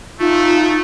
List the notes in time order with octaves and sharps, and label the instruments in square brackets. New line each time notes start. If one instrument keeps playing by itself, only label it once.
[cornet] A3 [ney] D#4 [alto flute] F4